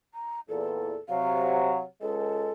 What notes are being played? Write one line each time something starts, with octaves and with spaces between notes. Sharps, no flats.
A#5
E2 A#2 A4
C3 F#3 F5
C#2 G#3 A4